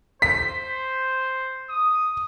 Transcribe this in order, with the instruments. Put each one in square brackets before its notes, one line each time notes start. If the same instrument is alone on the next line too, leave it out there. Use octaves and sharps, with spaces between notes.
[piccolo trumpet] C5 [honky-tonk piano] B6
[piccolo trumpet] D#6